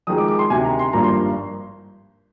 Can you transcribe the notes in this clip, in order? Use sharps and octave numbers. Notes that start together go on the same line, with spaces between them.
F2 D#3 G#3 D#6
D6
D6
C6
D2 C3 D#3 G#5
A#5
C6
G#1 G2 F3 A#3 A#5
C6